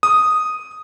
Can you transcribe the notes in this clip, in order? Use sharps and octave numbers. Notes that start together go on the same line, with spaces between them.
D#6